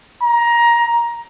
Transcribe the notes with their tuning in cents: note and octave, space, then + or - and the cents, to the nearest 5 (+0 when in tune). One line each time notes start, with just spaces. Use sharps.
A#5 +15